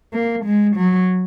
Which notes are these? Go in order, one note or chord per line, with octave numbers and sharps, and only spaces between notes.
A#3
G#3
F#3